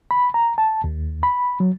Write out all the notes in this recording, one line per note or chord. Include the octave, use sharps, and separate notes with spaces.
B5
A#5
A5
D#2
B5
F#3